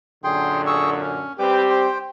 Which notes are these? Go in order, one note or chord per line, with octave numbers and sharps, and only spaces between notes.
F#2 A#2 D3 G#4 G5 C6
G#4 C#6 E6
C#4
G3 C4 G4 B4 G5 D6
C5 G5